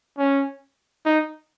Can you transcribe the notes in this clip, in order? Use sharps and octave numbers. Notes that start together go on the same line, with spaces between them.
C#4
D#4